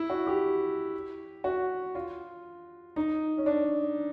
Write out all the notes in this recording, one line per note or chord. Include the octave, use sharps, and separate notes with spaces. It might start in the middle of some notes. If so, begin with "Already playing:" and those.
Already playing: E4
F#4
G4
F#4
F4
D#4
C#4
D4